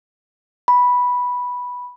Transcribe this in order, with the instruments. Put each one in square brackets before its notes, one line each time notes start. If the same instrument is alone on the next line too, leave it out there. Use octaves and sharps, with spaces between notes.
[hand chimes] B5